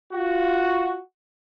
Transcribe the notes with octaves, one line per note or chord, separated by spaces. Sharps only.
F4 F#4